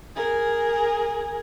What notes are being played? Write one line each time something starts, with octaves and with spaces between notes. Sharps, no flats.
G#4 A#4